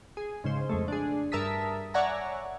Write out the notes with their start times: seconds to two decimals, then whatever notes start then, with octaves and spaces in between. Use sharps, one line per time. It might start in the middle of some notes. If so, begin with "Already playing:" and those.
0.17 G#4
0.44 G#2 C#3 C5
0.69 F2 G#3 A3
0.88 D4 G#4
1.32 G2 A#4 E5 A5 D#6 B6
1.94 C#5 D5 E5 F#5 G#5 A#5